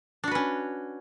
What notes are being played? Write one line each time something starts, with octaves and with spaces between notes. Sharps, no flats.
C#4 D4 F#4 B4